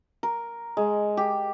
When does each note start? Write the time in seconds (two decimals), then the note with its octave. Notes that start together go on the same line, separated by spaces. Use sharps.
0.23 A#4
0.77 G#3
1.17 G4